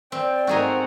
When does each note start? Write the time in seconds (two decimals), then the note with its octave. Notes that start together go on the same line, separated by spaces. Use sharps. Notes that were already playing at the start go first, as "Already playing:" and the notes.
0.12 C4 D5 G5
0.47 G#2 A3 C4 F#4 G#4 A#4 D#5 F#5